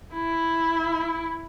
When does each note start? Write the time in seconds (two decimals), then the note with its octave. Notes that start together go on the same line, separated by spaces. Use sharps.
0.14 E4